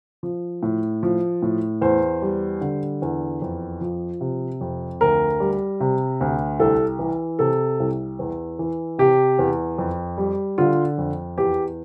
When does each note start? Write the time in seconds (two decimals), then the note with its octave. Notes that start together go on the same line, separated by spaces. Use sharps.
0.23 F3
0.63 A2
1.03 F3
1.42 A2
1.82 E2 C5
2.22 G3
2.61 D3
3.02 E2
3.42 F2
3.81 F3
4.21 C3
4.61 F2
5.01 D2 A#4
5.40 G3
5.80 C3
6.21 D2
6.60 C2 A4
6.99 E3
7.39 C3 A4
7.80 C2
8.19 E2
8.59 E3
8.98 C3 G4
9.39 E2
9.78 F2
10.18 G3
10.58 D3 F4
10.98 F2
11.38 E2 G4